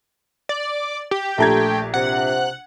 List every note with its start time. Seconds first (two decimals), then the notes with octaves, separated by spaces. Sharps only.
0.49 D5
1.11 G4
1.38 A#1 A3 A#5 G#6
1.94 C3 F#5